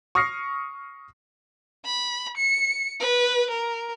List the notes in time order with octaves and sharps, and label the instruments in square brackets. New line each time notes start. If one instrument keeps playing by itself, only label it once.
[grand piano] C#6 D#6 F6 A#6 C7 C#7
[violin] B5
C#7
B4
A#4